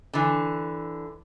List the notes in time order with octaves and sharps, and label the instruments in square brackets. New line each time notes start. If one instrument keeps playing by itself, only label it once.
[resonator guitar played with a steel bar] D3 E3